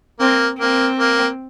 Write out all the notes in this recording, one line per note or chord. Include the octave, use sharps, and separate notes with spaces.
A#3 C4
A#3 C4
A#3